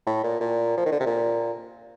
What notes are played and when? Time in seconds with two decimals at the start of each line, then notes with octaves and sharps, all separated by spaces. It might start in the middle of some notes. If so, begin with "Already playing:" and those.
0.07 A2
0.24 A#2
0.40 A#2
0.77 F3
0.86 D#3
0.92 D3
1.00 C3
1.06 A#2